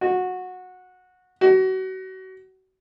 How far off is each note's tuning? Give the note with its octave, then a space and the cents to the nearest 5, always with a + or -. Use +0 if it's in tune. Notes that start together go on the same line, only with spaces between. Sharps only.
F#4 -15
F#4 +30